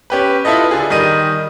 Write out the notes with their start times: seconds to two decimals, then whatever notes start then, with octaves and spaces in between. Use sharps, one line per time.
0.10 C#4 G4 B4
0.45 E4 F4 A4 B4 D#5
0.71 D3 G#4
0.90 D#3 G3 D#5 D#7